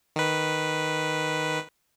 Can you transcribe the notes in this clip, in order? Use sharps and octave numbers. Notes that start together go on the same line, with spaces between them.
D#3 B4